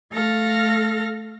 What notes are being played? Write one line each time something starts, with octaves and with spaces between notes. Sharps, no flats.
A3 A4 F5 F6 A#6